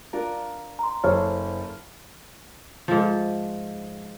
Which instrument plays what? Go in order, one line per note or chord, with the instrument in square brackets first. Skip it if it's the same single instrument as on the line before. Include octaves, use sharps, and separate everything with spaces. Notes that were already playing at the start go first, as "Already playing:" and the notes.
[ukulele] D4 F4 A#4
[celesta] A#5 C6
[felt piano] F#1 [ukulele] A4 C5 C#5 [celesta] F6
[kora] G#2 F3